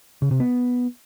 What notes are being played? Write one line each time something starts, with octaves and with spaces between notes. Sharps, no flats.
C#3
C3
B3